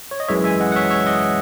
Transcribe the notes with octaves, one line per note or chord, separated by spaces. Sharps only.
C#5
D#5
F#2 E3 G#3 C#5 E5
E5 G#5
D#5 F#5
F#5
C#5 E5
C#5 E5
D#5 F#5